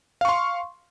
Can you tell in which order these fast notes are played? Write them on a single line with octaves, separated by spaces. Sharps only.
F5 C#6 C6